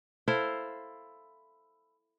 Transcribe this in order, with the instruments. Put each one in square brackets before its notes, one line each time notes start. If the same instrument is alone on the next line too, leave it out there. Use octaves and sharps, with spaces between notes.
[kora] E4 A4 C5 F5